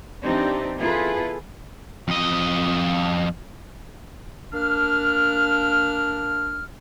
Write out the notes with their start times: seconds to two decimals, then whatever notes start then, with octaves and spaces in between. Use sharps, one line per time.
0.23 E3 C4 D4 D#4 G4
0.79 B3 E4 F4 G#4 A4 B4
2.08 F2 D#5
4.53 A#3 D4 F6